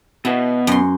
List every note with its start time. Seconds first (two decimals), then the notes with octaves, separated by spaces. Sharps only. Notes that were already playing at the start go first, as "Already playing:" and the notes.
0.25 B2 B3 E4
0.67 F#2 C6